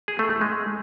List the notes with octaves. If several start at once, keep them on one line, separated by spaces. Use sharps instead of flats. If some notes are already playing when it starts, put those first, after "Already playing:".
G#4
A3
A3
G#3